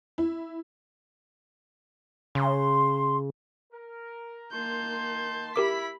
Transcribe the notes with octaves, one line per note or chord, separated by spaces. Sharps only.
E4
C#3 C6
A#4
D#3 A#3 A5 C6 G6
E4 G4 A#4 B5 D6 B6